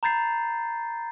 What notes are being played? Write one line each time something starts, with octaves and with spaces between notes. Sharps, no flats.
A#5 B5 G6 A6 C7